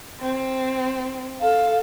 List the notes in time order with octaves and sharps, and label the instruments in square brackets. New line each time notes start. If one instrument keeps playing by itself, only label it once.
[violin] C4
[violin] A4 [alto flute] F5